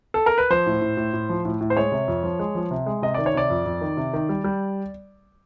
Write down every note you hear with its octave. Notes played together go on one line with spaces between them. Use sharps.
A4
A#4
B4
F3 C5
A2
A2
A2
A2
F3
A2
A2
C5
G#3 C#5
C3
F2
F3
G#3
F3
C3
G#3
C3 D#5
D#3 D5
C#5
C3 D5
F2
F2
D#3
C3
D#3
G3
G3